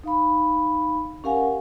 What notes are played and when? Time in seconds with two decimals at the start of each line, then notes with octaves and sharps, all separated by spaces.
0.04 D#4 F5 B5
1.24 C#4 G4 A#4 F5 F#5 G#5